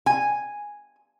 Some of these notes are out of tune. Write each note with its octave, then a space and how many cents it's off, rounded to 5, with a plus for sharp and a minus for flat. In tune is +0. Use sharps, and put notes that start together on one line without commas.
G#5 -5